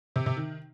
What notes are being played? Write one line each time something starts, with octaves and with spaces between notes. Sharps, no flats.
C3
C3
D#3